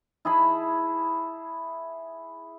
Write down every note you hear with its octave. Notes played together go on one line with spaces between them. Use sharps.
E4 G#4 A5 B5